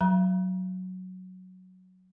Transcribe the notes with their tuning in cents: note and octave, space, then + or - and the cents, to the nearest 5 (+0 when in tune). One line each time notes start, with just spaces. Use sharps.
F#3 +0 A#5 +40